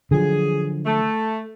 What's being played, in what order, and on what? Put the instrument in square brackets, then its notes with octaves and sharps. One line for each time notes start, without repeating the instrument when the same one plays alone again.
[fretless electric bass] D3 F3 F#3 [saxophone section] G#4
[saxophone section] A3